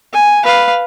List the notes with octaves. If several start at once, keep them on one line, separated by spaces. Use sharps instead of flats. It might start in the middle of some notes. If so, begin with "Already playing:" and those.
G#5
B4 F5